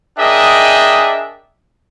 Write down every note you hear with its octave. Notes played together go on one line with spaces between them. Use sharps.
D4 G#4 A#4 D#5 E5 G5